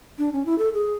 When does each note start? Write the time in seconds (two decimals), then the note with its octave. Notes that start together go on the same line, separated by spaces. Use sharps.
0.18 D4
0.33 C#4
0.46 E4
0.58 A4
0.74 G#4